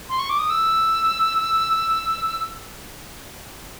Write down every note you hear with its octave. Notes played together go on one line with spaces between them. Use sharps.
C6
C#6
D6
D#6
E6